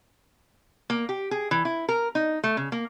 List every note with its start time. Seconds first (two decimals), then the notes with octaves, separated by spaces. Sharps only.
0.90 A#3
1.09 G4
1.31 G#4
1.51 E3
1.65 E4
1.89 A#4
2.15 D#4
2.44 A3
2.57 C#3
2.72 A#3